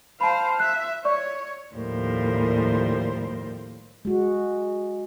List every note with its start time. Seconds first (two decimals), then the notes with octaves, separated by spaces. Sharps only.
0.21 C5 F5 A5 B5
0.60 E5 F#6
1.05 C#5 D5 C#6
1.75 D#2 A2 F3 G3 A#4 C5
4.05 G#3 F#4